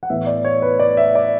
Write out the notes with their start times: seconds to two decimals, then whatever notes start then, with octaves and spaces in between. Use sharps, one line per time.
0.03 F#5
0.10 A2 E3 B3 E5
0.27 D5
0.45 C#5
0.62 B4
0.79 D5
0.97 E5
1.15 D5